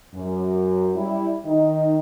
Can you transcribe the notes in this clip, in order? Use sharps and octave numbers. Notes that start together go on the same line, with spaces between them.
F#2
G3 E4
D#3 D#4